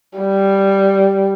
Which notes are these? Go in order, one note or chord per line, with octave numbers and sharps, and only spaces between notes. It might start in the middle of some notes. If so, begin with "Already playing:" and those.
G3